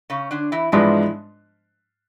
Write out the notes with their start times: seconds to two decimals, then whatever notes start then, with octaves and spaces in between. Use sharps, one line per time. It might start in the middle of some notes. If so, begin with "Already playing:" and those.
0.10 C#3 C#4
0.31 D3 D4
0.52 E3 E4
0.72 G#2 E3 F3 G#3 B3 D4 E4